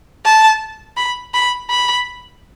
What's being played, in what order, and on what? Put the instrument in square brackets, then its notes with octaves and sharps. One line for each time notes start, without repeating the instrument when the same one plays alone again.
[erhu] A5
B5
B5
B5